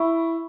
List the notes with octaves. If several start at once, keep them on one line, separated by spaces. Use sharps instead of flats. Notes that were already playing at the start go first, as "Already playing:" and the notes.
Already playing: E4 B5 C#6